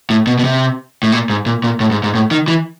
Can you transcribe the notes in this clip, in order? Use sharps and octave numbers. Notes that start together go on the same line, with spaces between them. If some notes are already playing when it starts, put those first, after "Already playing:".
A2
B2
B2
C3
A2
A#2
G#2
A#2
A#2
A2
G#2
G#2
A2
D#3
E3